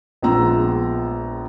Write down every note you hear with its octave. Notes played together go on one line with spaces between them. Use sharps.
A#1 G#3 B3 F4 A#5 E6